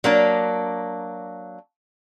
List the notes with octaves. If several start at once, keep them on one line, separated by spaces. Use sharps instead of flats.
F#3 A#3 D4